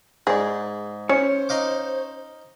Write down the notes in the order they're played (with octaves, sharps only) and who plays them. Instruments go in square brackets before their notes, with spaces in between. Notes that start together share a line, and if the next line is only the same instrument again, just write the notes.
[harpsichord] G#2 [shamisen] G#4 D5
[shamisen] C#4 [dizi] C5 [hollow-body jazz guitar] C#5
[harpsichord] D#4 F5 D6